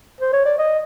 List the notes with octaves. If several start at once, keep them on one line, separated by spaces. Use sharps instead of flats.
C5
C#5
D5
D#5